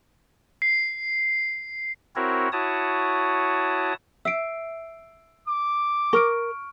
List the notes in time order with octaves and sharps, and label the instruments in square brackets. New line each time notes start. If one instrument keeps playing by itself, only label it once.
[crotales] C7
[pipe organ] C4 E4 F#4 A#4 C#5
E4 F#4 C#5 A5 D#6
[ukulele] E5 [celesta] E6 C7 D7
[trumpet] D6
[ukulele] A#4 [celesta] C#6 F6 D7